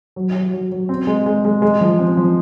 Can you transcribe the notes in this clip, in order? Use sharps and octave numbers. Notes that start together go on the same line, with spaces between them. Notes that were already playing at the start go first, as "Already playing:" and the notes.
F#3
F#3
F#3
F#3
C4
G#3
G#3
G#3
G#3
F3
C4
F3